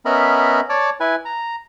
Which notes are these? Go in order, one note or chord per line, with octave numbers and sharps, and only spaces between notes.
B3 C#4 A#4 D#5 E5 B5
C#5 D5 A5 D6
E4 B4 G#5
A#5